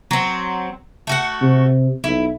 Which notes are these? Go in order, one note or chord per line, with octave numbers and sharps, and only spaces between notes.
F#3 C4
A3 F#4 F#5
C3
B1 E4